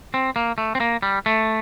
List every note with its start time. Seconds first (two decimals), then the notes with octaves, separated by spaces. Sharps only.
0.14 C4
0.36 A#3
0.58 A3
0.75 C4
0.80 A#3
1.03 G3
1.26 A3